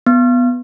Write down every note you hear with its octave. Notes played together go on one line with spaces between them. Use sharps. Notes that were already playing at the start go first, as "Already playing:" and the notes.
B3